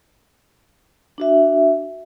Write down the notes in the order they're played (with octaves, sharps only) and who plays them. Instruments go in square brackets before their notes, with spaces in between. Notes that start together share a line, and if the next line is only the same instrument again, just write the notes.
[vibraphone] D4 F#4 E5